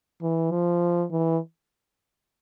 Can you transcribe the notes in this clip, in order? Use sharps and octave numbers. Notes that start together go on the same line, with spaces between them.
E3
F3
E3